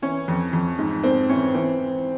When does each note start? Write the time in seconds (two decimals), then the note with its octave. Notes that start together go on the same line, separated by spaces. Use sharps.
0.02 E3 C#4
0.28 F2
0.53 F2
0.78 G#2
1.03 G#2 C4
1.29 E3 C#4
1.55 E3 C4